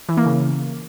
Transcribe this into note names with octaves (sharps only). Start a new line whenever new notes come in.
E3
A#3
C#3